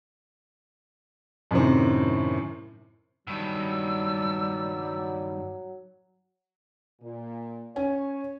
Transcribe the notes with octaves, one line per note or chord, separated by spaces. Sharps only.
F#2 A2 C3 D#3 C4
G2 D#3 F#3 G3 E6
A#2
C#4 C#5 G#5